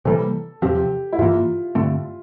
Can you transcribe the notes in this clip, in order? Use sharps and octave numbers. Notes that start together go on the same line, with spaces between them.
C3 E3 G3 A#3 A4
E2 C3 F3 C4 G4
E4
G2 E3 A#3 F4
G2 D3 A3 C4